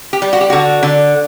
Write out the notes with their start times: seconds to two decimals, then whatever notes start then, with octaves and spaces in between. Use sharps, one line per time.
0.13 G4
0.22 G3
0.33 F#4
0.41 G4
0.50 D3 F#4
0.83 D3